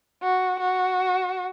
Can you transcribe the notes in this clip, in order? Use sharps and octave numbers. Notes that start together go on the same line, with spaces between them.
F#4
F#4